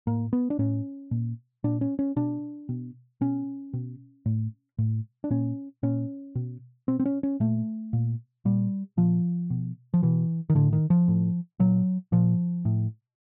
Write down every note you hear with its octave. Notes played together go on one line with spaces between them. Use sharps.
A2 A#3
B3
D4
A2 C#4
A#2
A#2 D4
C#4
C#4
B2 D4
B2
B2 C#4
B2
A2
A2
D4
A#2 C#4
A#2 C#4
B2
B2 C4
C4
C#4
C#4
A#2 A3
A#2
A#2 G3
A#2 F3
B2
F3
B2 E3
D#3
A2 D3
D#3
F3
A2
A#2 F#3
A#2 F3
A2